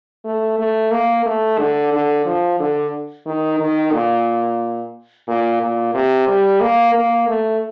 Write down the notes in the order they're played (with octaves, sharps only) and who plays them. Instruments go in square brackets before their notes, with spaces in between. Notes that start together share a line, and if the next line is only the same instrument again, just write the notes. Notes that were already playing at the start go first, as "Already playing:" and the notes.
[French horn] A3
A3
A#3
A3
D3
D3
F3
D3
D#3
D#3
A#2
A#2
A#2
C3
G3
A#3
A#3
A3